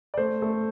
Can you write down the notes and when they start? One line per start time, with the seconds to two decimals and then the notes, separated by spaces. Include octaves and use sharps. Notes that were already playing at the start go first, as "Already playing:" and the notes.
0.14 D5
0.17 A3 C5
0.42 A3